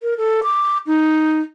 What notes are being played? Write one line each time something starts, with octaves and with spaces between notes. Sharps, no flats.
A#4
A4
D6
D#4